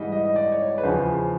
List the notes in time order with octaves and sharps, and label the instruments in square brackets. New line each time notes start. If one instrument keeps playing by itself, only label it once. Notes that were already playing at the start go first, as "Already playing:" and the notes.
Already playing: [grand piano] G#2 E3 G3 D#5
D#5
D#5
D5
C#5
C#5
B4
E2 C#3 F3 C5